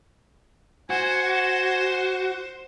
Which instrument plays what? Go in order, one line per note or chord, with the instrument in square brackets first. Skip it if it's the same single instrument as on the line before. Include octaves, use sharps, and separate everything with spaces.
[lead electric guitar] F#4 [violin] C5 [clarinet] G#5